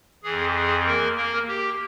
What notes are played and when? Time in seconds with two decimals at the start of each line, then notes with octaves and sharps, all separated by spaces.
0.24 F2 E3 G#4
0.55 G#4
0.86 A#3 A#4
1.17 A#3 A#4
1.48 G4